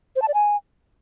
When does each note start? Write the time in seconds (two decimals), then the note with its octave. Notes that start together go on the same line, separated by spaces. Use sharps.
0.16 C5
0.22 A5
0.28 D5
0.34 G#5